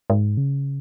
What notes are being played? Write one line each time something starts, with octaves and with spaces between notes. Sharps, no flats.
G#2
C#3